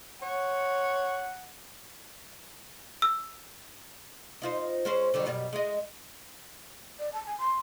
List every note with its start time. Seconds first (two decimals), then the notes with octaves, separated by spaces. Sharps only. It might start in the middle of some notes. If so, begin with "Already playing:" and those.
0.22 C#5 F#5
3.02 E6
4.42 D#4 F4 C5
4.85 G#3 C#4 C5
5.14 D3 F#3 G3
5.26 F#2 B2 G3
5.53 G#3 D#5
6.99 D5
7.12 A5
7.26 G#5
7.38 C6